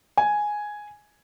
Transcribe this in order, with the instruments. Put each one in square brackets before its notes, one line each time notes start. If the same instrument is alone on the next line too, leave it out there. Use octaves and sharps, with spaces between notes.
[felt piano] G#5